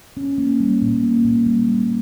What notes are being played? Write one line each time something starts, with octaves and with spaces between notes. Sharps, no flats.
C#4
A#3
G3
A#2
A#3
A#2
G3
G3